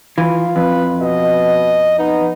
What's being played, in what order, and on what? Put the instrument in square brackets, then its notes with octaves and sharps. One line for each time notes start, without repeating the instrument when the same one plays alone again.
[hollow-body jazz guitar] E3 [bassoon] F4
[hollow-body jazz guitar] F2 [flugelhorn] B4
[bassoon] B2 [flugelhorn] D#5
[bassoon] B3 [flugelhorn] D#4